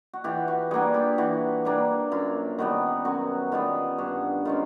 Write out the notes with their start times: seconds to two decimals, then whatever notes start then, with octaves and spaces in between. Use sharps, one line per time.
0.13 F#4
0.24 E3 F4 G4
0.48 F#4
0.71 G3 A#3 D4 F#4 G#4
0.94 F4 G4
1.18 E3 F#4
1.65 G3 A#3 D4
2.12 F#2 F4
2.58 D#3 G3 B3 F#4
3.05 F#2 F#4
3.52 D#3 G3 B3 F4
3.98 G2 F#4
4.45 D#3 G#3 C#4 F4